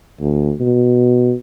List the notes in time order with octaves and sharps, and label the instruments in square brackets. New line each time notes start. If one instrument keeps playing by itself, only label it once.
[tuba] D2
B2